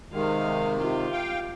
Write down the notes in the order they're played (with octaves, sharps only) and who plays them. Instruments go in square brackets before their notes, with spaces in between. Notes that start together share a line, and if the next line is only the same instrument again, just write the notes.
[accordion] C3 D#3 [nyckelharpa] G#3 F5
[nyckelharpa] F4 G4
[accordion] F5 G5